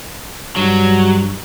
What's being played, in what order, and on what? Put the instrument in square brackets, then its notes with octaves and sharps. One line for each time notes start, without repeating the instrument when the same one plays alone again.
[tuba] G2 [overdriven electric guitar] F#3